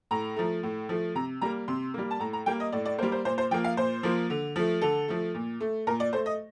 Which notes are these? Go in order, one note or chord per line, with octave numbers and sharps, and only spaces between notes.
A2 A#5
F3 A3
A2
F3 A3
C3 A#5
G3 A#3 A#5
C3 C6
G3 A#3
A5
A2 A#5
A#5
G3 A#3 G5
D#5
A2 D5
D5
G3 A#3 C5
C5
A#2 C5
C5
F3 A#3 G5
F5
A#2 C5
F3 A#3
D3
F3 A3
D3 A4
F3 A3
A#2
A3
A#2 A#4
D5
A3 C5
D#5